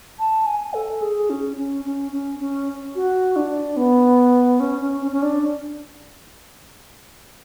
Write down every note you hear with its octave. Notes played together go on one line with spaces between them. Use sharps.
A5
G#5
A4
G#4
C#4
C#4
C#4
C#4
C#4
F#4
D4
B3
C#4
C#4
C#4
C#4
D4